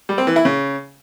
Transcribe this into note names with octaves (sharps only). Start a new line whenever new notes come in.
G3
C4
E3
E4
C#3